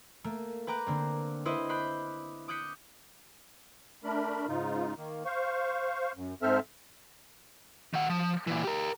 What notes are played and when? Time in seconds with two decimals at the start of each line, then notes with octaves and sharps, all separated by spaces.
0.24 A3 A#3
0.67 B4 G5 A#5 D6 F#6
0.87 D3 A#3 C4
1.45 E4 B4 C5 D#5
1.69 B5 D6 F#6 G6 B6 C7
2.48 D6 D#6 F#6 G6 B6 C#7
4.04 A3 D4 A#4 B5
4.48 G#2 C#3 D#4 F4
4.97 D#3 A#3
5.25 C5 F5 C#6
6.16 F#2
6.42 G#2 C4 A4 C5 E5 F6
7.94 D#3 F#5
8.09 F3
8.47 A#2 E3
8.64 G4 A#4